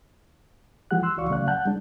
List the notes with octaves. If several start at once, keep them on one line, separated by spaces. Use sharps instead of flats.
E3 F3 G#3 G4 F#5 F#6
C6 E6 F#6
C#2 E3 F#4 D5 F5 C#6
C#3 F#3 A3 D5 F5 F#6
F#5 A5 F#6 G6
G3 G#3 D4